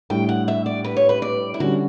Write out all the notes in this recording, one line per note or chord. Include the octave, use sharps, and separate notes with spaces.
A2 G3 D4 G5
F#5
E5
D5
B4
C#5
B4
D5
E4
D3 G3 C#4 F#4